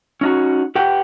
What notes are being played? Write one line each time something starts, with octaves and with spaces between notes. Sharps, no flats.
C#4 D#4 F#4
G4 B4 F#5 G5